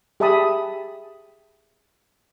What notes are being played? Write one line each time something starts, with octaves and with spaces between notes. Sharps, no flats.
G4 G#4 E5 A5 B5 D#6